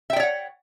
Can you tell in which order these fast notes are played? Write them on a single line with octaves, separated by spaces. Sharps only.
E5 G5 D5 C#5 F#5